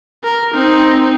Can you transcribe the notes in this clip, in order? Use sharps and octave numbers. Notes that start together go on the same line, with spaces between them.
A#4
C4 D#4